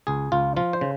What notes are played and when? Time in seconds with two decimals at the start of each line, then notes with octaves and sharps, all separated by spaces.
0.07 C#2 G#4
0.32 C#2 F4
0.56 F3 F4
0.73 C5
0.81 C#3